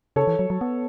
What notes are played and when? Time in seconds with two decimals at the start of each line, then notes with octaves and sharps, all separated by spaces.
0.16 C#3 A4 C#5
0.27 E3
0.39 F#3
0.50 F#3
0.61 B3